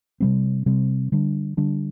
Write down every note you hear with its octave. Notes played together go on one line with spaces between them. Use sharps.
C3 G3 C4
C3 G3 C4
D3 G3 D4
D3 G3 D4